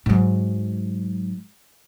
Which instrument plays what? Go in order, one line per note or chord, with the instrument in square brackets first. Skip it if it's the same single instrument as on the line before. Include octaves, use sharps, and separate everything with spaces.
[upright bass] G#2 F#3